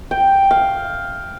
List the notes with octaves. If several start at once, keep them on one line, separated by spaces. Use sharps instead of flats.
G5
F5